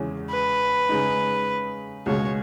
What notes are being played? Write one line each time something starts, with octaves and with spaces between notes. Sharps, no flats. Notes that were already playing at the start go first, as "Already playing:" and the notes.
Already playing: E2 C#3 G#3 C#4 E4
B4
C#3 G#3 D#4
C#2 B2 G#3 C#5